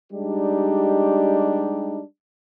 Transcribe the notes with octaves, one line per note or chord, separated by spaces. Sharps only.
G3 G#3 D4 D#4 G4